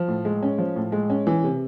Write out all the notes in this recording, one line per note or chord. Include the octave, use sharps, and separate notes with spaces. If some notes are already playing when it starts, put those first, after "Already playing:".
Already playing: F3
A2
G#3
C#4
F3
A2
G#3
C#4
E3
C3